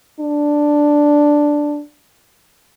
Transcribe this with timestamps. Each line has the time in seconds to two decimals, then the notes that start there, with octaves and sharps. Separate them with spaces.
0.20 D4